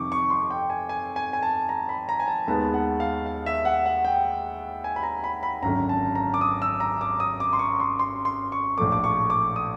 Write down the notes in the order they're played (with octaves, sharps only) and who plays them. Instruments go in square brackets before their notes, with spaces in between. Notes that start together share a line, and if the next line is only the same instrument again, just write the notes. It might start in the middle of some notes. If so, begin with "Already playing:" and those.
Already playing: [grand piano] F2 C3 D#3 C#6 D6
C#6
C6
G5
G#5
G#5
G#5
G#5
A5
A#5
B5
A#5
G#5
A5
D#2 D#3 G#3 B3 A5
F#5
F5
F5
E5
F#5
F#5
G5
G#5
B5
A#5
B5
B5
G#1 F#2 D3 A#5
A5
A#5
D6
D#6
E6
A#5
D6
D#6
D6
C6
C#6
C6
C6
C6
C#6
A#1 A2 F3 A3 D6
D6
C#6
D6
D#6